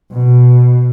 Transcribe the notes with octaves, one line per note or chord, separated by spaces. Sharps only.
B2